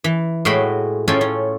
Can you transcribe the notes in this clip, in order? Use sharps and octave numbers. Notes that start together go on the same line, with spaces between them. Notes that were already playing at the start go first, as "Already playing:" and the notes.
E3
A2 G#3 F#4 B4 G5 B5
A2 C#4 F4 A4 G5 G#5
C#4